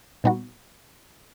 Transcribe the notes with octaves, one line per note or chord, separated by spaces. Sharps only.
A#2 G3 B3 D#4 F#4